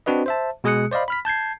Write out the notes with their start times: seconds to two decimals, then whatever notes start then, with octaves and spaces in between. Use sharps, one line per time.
0.06 C4 D4 F#4 B4 D#5
0.26 C5 E5 A5
0.64 B2 G#3 G#4 D#6 F#6 C#7
0.92 C5 D5 D#5 F5 B5
1.08 B5 F6 B6
1.25 A5 G6 G#6 C7